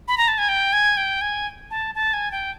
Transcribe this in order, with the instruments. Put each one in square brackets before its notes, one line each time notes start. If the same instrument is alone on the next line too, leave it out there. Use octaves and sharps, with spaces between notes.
[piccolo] B5
A#5
A5
G#5
G5
G#5
G5
G#5
A5
A5
G#5
G5